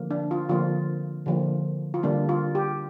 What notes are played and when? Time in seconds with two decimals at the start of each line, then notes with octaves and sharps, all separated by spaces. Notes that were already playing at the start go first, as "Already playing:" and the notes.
Already playing: D3 F3 A#3
0.11 D4
0.31 F4
0.49 D3 F3 A#3 F4
1.26 D3 F3 A#3
1.94 F4
2.03 D3 G3 A#3 D4
2.29 F4
2.55 G4